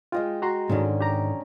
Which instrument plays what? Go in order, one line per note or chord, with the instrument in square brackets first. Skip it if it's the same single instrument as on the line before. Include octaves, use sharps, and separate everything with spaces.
[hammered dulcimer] G#3 D#5 G5 [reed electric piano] F4
[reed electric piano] F#4 A#5 C6
[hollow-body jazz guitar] G#2 D#3 [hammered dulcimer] D3 C#4
[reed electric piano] G4 A#5